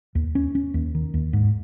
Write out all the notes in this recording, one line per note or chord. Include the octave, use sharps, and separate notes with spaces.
D#2
C#4
C#4
D#2
D#3
D#2
G#2